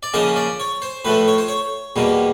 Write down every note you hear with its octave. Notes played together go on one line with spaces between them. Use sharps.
D5
C#3 F3 A#3 C#4 D#5
D5
C#5
C5
A2 F3 A3 B4
C#5
C5
C#5
E2 B2 G3 A#3